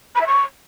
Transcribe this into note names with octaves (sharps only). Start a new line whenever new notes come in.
B5
E5
C#6